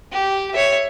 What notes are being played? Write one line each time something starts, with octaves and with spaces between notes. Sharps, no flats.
G4
C#5 E5